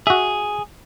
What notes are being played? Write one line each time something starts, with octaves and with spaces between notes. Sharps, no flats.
F#4 G#4 E5